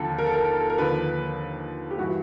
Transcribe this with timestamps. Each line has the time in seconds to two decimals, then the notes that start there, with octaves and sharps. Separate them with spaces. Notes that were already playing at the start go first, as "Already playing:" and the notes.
Already playing: D#2 D3 F3 A4
0.19 A#4
0.26 A4
0.34 A#4
0.61 A4
0.70 A#4
0.78 D#2 D3 F3 B4
1.91 G4
1.98 G2 E3 F#4